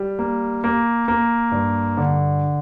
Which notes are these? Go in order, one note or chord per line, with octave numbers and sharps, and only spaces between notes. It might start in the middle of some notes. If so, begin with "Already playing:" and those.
Already playing: G3
A#3
A#3
A#3
G2
D3